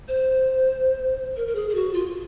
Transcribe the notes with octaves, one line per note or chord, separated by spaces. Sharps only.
C5
A#4
A#4
G#4
G#4
F#4
F4